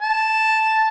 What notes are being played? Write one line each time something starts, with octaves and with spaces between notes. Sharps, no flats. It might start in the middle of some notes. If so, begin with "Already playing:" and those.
A5